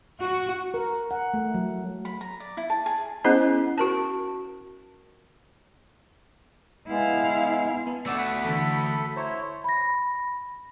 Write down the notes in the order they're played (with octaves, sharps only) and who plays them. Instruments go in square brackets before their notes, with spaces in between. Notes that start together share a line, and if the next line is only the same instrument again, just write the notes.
[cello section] F#4
[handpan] A#4
F#5
A3
F#3
[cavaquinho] B5
A#5
D5
E4
A5
G#4
[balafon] B3 C#4 E4 G#4 C5 D#5
F#4 A#4 A5
[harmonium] G#3 B3 [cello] E4 F5
[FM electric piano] B3 A5
[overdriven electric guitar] A3 F#4 [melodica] D5 [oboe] E6
[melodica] F#5 [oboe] B5
[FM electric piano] D3 E3 [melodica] A4
[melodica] E4 C5 C#5 [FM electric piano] A#5
[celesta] B5 A#6